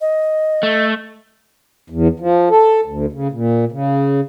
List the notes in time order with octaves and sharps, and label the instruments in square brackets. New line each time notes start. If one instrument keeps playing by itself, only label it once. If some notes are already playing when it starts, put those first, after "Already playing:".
[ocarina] D#5
[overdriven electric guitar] A3
[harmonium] E2
F3
A4
D2
C#3
A#2
C#3